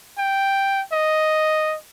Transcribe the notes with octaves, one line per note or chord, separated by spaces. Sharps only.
G5
D#5